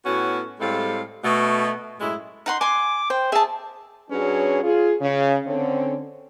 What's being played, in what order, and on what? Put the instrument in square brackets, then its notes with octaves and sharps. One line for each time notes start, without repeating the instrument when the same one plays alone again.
[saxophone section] A2 B3 C#4 F#4
A2 G3 G#3 C4 A4 F5
B2 A3
F#2 A2 G#3 E4
[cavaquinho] D#4 F#5 C6
[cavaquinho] G#5 C6 [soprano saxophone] D6
[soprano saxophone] C5 [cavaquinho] G5
[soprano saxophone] G#4 [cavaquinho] E5 A5
[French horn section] F#3 C#4 D4 G#4 B4 C#5
F4 G#4
C#3
D3 C4 C#4